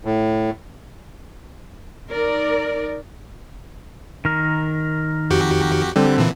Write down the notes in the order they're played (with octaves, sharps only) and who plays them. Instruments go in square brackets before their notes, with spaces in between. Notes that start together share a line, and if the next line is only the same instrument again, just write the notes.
[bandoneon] A2
[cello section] D#4 A#4 D5
[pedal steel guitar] D#3 A#4
[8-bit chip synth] F2 F#4 G4
[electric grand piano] D3 C4 [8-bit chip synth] G3
[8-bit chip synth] A#2 E3